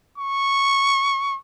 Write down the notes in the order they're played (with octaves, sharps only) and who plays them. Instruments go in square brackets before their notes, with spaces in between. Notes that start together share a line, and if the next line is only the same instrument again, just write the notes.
[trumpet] C#6